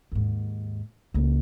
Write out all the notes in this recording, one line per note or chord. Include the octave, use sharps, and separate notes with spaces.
D#2 G#2
C#2 A#3